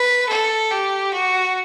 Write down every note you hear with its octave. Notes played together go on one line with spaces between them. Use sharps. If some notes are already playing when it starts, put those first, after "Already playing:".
Already playing: B4
A4
G4
F#4